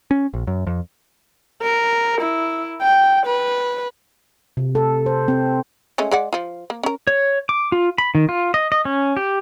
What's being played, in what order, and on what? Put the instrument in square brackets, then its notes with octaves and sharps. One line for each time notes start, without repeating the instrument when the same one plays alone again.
[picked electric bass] C#4
A#1
F#2
F2
[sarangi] A#4
E4
G5
B4
[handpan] C3
A4
C5
C4
[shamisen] G#3 A3 C#4
G#3 D5 F#5
F3 F4
A#3
C#4 A#4
[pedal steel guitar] C#5
D6
F4
B5
D#3
F4
D#5
D#5
C#4
G4